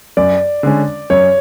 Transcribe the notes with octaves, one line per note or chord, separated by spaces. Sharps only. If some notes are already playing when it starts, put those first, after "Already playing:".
F#2 D5
D3 G#3 C#4
F#2 C#5